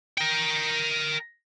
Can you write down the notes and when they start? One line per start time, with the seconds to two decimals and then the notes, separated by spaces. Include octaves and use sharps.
0.17 A#4 G5